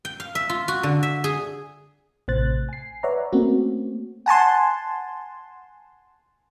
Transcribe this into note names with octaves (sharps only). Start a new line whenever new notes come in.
G5
F5
E5
F4
F#4
D3
E5
G#4
A1 A2 C3 C5 F#6 A6
G#5 C7
B4 C#5 D5 E5 F#5 A#5
A3 A#3 C4 C#4 F#4
F#5 G#5 A5 C6